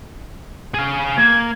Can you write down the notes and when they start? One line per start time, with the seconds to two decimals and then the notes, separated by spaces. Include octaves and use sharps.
0.74 G#4 F5
1.18 A#3 G#6